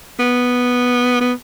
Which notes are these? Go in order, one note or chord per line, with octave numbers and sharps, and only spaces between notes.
B3
B3